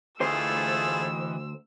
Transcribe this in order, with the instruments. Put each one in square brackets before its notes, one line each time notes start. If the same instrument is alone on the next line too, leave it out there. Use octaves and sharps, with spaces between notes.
[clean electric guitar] D2 C5 [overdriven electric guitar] E3 D#5 [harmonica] A3 F4 G#4 [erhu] E6